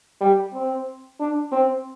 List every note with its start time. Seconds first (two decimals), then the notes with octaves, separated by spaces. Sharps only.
0.21 G3
0.54 C4
1.19 D4
1.52 C4